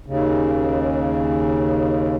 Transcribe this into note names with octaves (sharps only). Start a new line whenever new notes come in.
D#2 C#3